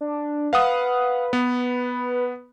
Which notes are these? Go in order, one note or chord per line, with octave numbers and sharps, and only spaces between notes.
D4
B4 F5 F#5 D#6
B3